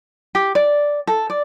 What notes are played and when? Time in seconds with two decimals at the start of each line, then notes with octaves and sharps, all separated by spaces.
0.35 G4
0.55 D5
1.07 A4
1.30 D5